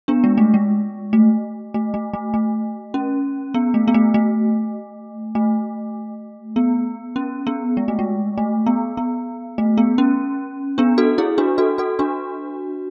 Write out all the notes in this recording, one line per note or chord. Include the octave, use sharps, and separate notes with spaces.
B3 D4
G#3
A3
G#3
A3
A3
A3
A3
A3
C#4
B3
A3
B3
A3
A3
A3
B3
C#4
B3
G#3
A3
G#3
A3
B3
B3
A3
B3
C#4
B3 D4
F#4 A4
E4 G#4
D4 F#4
F#4 A4
F#4 A4
D4 F#4